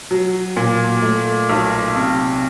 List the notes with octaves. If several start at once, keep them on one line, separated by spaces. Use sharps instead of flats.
F#3
A#2
A3
B1
C3